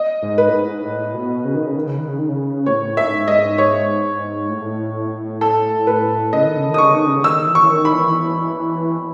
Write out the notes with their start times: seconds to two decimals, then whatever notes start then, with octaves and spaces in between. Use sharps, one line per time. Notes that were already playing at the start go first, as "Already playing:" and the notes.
Already playing: D#5
0.22 G#2
0.38 B4
0.48 A2
0.54 G#2
0.83 A2
1.14 B2
1.45 C#3
1.55 D#3
1.66 C#3
1.77 D#3
1.87 C#3
1.98 D#3
2.08 C#3
2.19 D#3
2.29 C#3
2.66 A2 C#5
2.97 G#2 E5
3.28 G#2 D#5
3.58 C#5
4.50 A2
5.41 A4
5.87 B4
6.33 C#3 D#5
6.45 D#3
6.57 C#3
6.70 D#3 D#6
6.78 C#3 C#6
6.93 D#3
7.05 C#3
7.24 D#3 E6
7.47 E3
7.55 C#6
7.64 E3
7.69 D#3
7.85 B5
7.93 E3